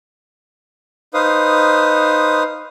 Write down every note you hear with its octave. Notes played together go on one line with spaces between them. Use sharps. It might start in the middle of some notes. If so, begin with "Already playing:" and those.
D#4 B4 C5 F5 D#6